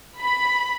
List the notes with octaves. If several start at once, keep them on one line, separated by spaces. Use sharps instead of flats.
B5